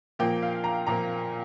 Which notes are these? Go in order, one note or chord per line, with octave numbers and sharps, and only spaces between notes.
A#2 F3 A#3 G5
F5
A#5
A#2 F3 A#3 A#5